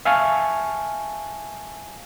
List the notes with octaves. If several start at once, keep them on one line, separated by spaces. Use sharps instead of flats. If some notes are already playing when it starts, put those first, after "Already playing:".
E5 F5 G#5 A5 C#6 F6